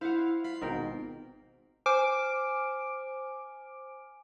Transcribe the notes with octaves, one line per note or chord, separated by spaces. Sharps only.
E4 C5 F5 F#5
F4 B5 C7
G#1 G#2 B2 A#4 G5
C5 G#5 D6 F6 D7